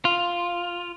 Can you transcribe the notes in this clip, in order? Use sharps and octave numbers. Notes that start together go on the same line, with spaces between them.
F4